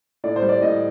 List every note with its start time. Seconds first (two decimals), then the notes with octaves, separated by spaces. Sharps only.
0.24 A2 D5
0.36 C5
0.42 G3
0.49 D5
0.62 A2 D#5